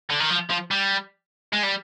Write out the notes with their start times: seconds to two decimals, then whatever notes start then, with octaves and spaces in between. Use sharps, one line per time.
0.10 D3
0.20 D#3
0.30 F3
0.50 F3
0.71 G3
1.53 G#3
1.63 G3